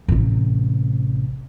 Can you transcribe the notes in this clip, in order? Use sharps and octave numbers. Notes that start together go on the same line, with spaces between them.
A1 C3